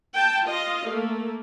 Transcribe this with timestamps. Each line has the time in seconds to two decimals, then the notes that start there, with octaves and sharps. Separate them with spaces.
0.15 G5 A5
0.46 F4 D#5 F5
0.88 A3 A#3